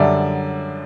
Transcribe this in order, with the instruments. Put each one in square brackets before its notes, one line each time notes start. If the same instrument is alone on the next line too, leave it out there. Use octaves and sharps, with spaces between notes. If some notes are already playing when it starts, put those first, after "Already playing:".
Already playing: [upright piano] F#2 D3 G3 D5 E5